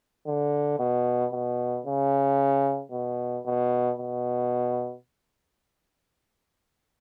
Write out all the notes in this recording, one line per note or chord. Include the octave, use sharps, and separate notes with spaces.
D3
B2
B2
C#3
B2
B2
B2